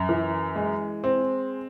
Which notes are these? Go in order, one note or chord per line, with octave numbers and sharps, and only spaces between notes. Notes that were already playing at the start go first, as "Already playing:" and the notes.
Already playing: F#2
E3
G#3
C4